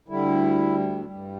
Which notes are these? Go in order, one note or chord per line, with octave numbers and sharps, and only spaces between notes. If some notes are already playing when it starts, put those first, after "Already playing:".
D2 D3 G3 E4
G2 G3